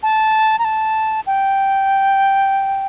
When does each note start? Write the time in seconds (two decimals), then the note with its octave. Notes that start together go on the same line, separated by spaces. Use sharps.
0.03 A5
0.59 A#5
0.64 A5
1.26 G5